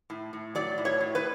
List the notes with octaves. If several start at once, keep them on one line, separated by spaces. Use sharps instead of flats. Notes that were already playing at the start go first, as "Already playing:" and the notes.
A2
A2
F#3 D5
A2
C#5
A2
B4